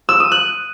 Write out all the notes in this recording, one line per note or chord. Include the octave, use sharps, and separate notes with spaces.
E6
D#6
F#6